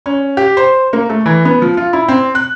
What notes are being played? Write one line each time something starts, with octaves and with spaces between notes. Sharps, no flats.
C#4
G4
C5
A#3
A3
E3
B3
F3
F4
E4
C4
F#6